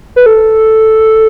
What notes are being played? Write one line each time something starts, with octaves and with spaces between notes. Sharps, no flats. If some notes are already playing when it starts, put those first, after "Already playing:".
B4
A4